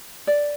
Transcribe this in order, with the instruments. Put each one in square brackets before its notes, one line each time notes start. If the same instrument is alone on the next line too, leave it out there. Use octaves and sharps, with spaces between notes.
[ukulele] D5